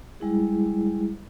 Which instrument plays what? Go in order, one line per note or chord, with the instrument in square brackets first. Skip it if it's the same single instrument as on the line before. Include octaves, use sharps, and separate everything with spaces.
[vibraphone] G3 G#3 E4 G#4